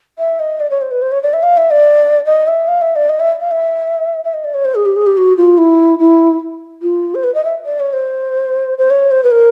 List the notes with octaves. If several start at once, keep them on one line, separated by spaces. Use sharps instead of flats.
E5
D#5
D5
C#5
C5
B4
C5
C#5
D5
E5
F5
E5
D5
D#5
E5
F5
E5
D5
D#5
E5
F5
E5
E5
D#5
D5
C#5
C5
G#4
G4
G#4
G4
F#4
F4
E4
E4
F4
C5
B4
D#5
E5
D5
C#5
C5
C5
C#5
C5
B4
A#4